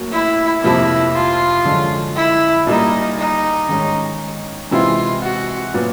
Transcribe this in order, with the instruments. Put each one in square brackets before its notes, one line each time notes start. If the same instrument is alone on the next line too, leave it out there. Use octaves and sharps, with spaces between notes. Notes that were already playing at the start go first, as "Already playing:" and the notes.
Already playing: [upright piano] A2 F#3 A#3 C#4 F#4
[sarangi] E4
[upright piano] F2 C3 F3 A#3 [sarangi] E4
[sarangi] F4
[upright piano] F#2 D3 F3 G#3 C#4
[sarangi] E4
[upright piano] A#2 G3 A#3 [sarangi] D#4
[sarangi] D#4
[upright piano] D#3 G#3 C#4
[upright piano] C3 E3 G#3 C4 E4 [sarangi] F4
[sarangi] F#4
[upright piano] A#2 F#3 B3